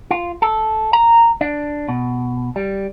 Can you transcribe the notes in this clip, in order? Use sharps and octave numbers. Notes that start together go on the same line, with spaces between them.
F4
A4
A#5
D4
B2
G3